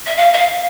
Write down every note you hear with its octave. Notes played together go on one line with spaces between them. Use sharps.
E5
F5
E5
F5